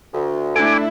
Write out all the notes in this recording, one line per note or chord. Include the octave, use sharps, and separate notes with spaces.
D2
A3 D4 E4 A4 G#5 D6